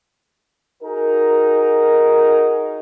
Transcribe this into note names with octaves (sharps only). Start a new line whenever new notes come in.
D#4 F#4 G#4 A#4